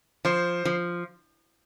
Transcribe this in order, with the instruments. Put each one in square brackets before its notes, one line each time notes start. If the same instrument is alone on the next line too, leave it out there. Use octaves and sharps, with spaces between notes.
[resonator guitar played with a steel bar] F3 [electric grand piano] C5
[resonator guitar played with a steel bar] F3